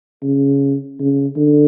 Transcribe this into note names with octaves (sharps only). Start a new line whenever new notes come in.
C#3
C#3
D3